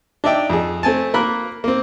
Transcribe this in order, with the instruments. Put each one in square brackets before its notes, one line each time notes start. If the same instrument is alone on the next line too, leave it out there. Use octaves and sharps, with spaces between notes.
[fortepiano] D4 D#4 D5 E5 G5
F2 G#4
A3 C4 G#5 A5
A#3 A#4 B5 F#6
A#3 C4